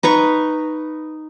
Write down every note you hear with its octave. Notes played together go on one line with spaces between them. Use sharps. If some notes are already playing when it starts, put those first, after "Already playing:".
D#4 B4 A#5 C#6